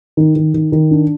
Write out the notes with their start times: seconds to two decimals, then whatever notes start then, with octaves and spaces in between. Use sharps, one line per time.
0.17 D#3
0.36 D#3
0.54 D#3
0.72 D#3
0.91 D4